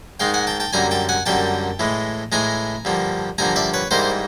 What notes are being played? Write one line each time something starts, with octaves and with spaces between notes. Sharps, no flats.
G#2 D#3 G#3 F5 G5
F#5 G#5
G5 A5
G5 A5
F#2 D3 G3 A#3 G#5 A#5
G5 A5
F#5 G#5
F#2 D3 G3 A#3 G5 A5
A2 E3 G#3
A2 E3 G#3 G#5 A#5
G2 D3 F3 A#3
G2 D3 F3 A#3 G#5 A#5
D5 E5
B4 C#5
G#2 E3 G3 A#3 A#4 C5